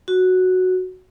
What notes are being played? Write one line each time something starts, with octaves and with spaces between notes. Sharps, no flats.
F#4